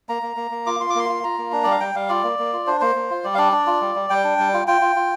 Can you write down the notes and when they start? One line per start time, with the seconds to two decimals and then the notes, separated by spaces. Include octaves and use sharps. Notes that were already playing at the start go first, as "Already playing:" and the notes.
0.09 A#3 A#5
0.22 A#3
0.37 A#3
0.51 A#3
0.66 F4 D6
0.80 F4 C6
0.90 D6
0.95 A#3 C6
1.09 F4
1.24 F4 A#5
1.38 A#3
1.53 D4
1.64 G3 D5
1.71 F5
1.80 G3 G5
1.95 G3 F5
2.09 F4 D5
2.24 A#3
2.39 A#3
2.53 F4
2.67 D4 C5
2.81 A#3 C5
2.96 A#3
3.10 F4
3.24 G3 D5
3.34 F5
3.38 D4 D5
3.52 D4
3.67 F4
3.81 G3
3.95 G3
4.10 G3 G5
4.24 D4
4.39 G3
4.54 F4
4.67 F4 G5
4.81 F4
4.96 F4